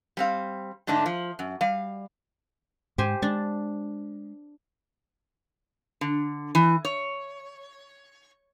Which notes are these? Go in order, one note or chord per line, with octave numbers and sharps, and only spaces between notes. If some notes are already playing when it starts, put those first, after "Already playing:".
G3 C4 F5
G#2 D3 A3 D4 D#4
F3
F#2
G3 F5
G#2 G4 C5 G#5
G#3 D4 A5
D3
E3
C#5